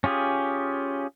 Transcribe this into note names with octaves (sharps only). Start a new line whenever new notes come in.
C#4 F4 G4 G#4